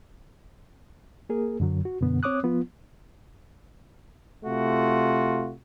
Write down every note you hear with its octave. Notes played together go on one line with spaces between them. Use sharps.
A#3 G#4 A#4
F#2 D3 F#3
F#4
F#2 B2 D3 B3
C4 C#5 D6 D#6 F#6
F3 B3 F4
C3 A3 F4 F#4